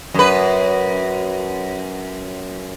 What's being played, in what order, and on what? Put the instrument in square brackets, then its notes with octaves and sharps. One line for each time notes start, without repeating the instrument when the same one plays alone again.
[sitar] F#2 B4